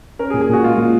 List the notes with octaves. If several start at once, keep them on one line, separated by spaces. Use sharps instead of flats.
C#4 A#4
G#4
A#2
G#4
A#2 F#4
G#3 F4
A#2